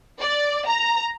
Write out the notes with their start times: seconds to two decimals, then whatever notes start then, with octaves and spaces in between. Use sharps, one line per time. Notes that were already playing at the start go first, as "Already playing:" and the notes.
0.19 D5
0.67 A#5